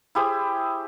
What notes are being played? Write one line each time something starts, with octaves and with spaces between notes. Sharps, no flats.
E4 G4 G#4 C5